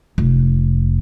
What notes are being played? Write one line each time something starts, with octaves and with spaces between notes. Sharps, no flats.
F1